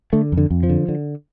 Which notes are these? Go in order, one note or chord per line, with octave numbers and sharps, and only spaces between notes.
D3 A3
F2
D3
F2
F3
D3
D3